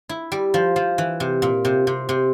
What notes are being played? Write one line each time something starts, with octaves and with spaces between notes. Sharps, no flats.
E4
G3
F3
F3
E3
C3
A#2
C3
C3
C3